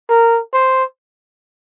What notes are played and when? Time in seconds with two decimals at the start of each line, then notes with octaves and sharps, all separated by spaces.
0.09 A#4
0.53 C5